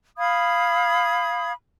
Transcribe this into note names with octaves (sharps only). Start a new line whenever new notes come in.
F5 B5 D#6 G#6